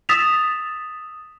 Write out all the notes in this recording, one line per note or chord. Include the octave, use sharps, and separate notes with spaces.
D#6 E6 A6 B6 E7 F7